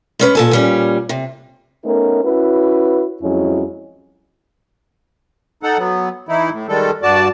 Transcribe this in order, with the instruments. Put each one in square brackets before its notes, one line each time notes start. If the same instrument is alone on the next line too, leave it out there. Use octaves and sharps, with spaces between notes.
[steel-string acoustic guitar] G#3 C#4 B4
A#2 A4 G#5
A#2 G3 C#4
C3
[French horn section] A3 B3 C#4 D#4 A4 A#4
C#4 E4 F#4 B4
F2 F#3 G#3 C#4 E4
[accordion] D#4 A4 F#5
F#3 B3
E3 D#4 E4
A2
D#3 G3 G#3 A4
G2 F#4 D5 A5